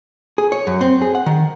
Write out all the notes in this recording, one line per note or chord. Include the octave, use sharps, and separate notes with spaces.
G#4
C#5
F#2
C4
G#4
F#5
D#3